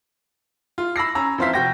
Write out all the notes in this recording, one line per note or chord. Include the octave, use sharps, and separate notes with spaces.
F4
B5 E6 A#6 C7
C#4 A#5 B5 E6
F2 E3 C5 E5 F5 B6
F1 F#4 G5 A#6